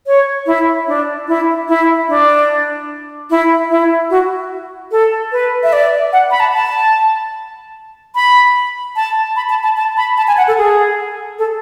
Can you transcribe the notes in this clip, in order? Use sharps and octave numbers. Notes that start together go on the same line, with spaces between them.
C#5
E4
D4
E4
E4
D4
E4
E4
F#4
A4
B4
E5
D5
F#5
B5
A5
A5
B5
A5
B5
A5
A5
A5
B5
A5
G#5
F#5
A4
G#4
A4